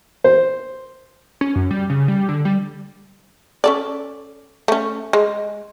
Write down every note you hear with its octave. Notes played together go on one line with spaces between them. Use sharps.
C5
C#4
F#2
G3
C#3
G3
D3
G3
C#4 A4 D5
A3 C#4
G#3